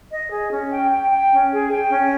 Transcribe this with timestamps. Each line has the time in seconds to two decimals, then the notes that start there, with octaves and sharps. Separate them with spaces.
0.12 D#5
0.32 G#4
0.52 C#4
0.71 G5
0.91 G5
1.11 G5
1.32 C#4
1.51 G#4
1.71 G5
1.90 C#4